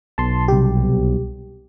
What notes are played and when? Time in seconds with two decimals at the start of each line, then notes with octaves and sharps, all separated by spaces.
0.18 B1 A5 C6
0.48 C2 G4